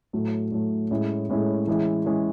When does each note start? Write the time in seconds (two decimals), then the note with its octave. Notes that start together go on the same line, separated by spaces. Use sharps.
0.13 A2 F#3 A3
0.52 A2 F#3 A3
0.91 A2 G#3 C#4 E4 G#4
1.29 A2 G#3 C#4 E4 G#4
1.67 E3 G#3 C#4 E4 G#4
2.06 E3 G#3 C#4 E4 G#4